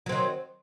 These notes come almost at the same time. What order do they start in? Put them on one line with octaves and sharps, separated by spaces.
F#3 C4 D#3